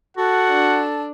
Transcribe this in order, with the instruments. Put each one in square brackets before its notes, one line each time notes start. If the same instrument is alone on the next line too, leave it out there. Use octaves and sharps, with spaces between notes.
[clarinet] F#4 [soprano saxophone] A4 [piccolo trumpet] F#5
[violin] D4